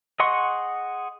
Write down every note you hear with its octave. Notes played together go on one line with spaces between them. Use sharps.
G#4 D#5 F#5 C6 C#6